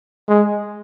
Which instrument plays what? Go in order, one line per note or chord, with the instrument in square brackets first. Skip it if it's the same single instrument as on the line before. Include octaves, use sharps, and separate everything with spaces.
[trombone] G#3